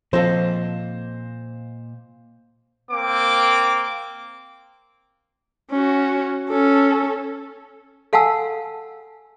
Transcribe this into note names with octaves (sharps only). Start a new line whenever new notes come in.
A#2 F3 C4 A4 C5 D#5 F5
A#3 C4 D6
C#4 F#4
C#4 A4
A4 F5 F#5 G#5 A5 E6